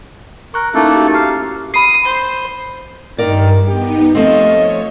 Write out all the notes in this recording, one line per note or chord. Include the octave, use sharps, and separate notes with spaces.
A#4 C#6 F#6
A3 A#3 C#4 D#4 E4 A4
F#4 G4
F5 A#5
B5 D#6 C7
C5
G2 D#3 A#4 D5
B3 D#4 G4
F3 A3 C4 D#5 F5 C#6
C#5